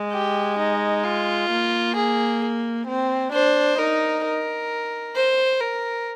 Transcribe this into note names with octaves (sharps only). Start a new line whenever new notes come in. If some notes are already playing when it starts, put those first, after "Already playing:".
Already playing: G#3
G4
D#4
F4
A#3
G#4
C4
D4 C5
D#4 A#4
A#4
C5
A#4